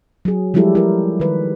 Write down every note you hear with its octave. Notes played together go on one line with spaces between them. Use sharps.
F#3 G#4
F3 G3 G#3 E4 G4 A4
E4 A#4
D#3 B4